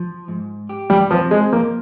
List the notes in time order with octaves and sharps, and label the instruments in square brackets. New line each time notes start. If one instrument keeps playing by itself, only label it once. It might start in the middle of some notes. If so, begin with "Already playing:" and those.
Already playing: [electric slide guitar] F3
G#2
G4
[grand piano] G3
[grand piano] F3 [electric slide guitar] C4
[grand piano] G#3
[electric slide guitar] F3 [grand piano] A#3